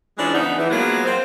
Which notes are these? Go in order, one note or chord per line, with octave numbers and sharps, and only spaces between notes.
E3 F3 G#3 C#4 D4
C#3 E3 B3 D4 D#4
E3
F3 F#3 G#3 A#3 B3
C4